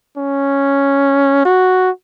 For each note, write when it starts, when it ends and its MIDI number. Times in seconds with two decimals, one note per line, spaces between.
0.18 1.41 61
1.45 1.90 66